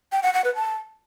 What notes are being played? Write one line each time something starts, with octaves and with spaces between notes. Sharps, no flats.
G5
F#5
F#5
B4
A5